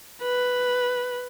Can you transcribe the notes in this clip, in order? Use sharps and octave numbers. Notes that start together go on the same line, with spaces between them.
B4